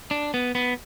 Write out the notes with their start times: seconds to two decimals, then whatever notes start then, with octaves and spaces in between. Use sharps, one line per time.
0.11 D4
0.34 B3
0.55 B3